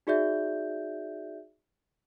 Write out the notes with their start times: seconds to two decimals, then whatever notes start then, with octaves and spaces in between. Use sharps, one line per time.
0.07 D#4 F#4 G#4 D5 E5 G6